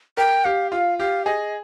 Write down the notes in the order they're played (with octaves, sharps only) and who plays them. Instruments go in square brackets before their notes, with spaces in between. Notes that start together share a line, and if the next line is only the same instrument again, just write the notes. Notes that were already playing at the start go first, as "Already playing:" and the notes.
[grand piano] A#4 [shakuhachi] G5
[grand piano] G4 [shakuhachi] F5
[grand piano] F4 [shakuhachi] F5
[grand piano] G4 [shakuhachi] F5
[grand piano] G#4 [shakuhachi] D#5